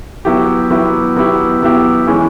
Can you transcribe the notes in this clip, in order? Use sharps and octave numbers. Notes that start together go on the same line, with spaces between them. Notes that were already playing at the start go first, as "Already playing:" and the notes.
F#3 B3 E4 G4
F#3 B3 E4 G4
F#3 B3 E4 G4
F#3 B3 E4 G4
E3 G#3 C#4 E4